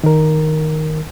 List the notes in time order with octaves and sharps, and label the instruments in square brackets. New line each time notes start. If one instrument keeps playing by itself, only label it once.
[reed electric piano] D#3 A#4